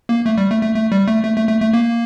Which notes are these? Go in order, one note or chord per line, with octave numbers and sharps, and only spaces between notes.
A#3
A3
G3
A3
A3
A3
G3
A3
A3
A3
A3
A3
A#3